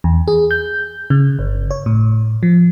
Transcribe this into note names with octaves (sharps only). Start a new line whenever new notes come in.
E2
G#4
G6
C#3
G1
C#5
A2
F3